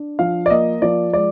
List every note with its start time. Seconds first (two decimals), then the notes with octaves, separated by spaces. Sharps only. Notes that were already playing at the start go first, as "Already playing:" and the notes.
Already playing: D4
0.19 F3 F5
0.46 D5
0.50 A#3 D#5
0.82 F3 D5
1.13 G#3 D5